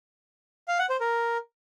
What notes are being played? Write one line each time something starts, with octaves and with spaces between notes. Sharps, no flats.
F5
F#5
C5
A#4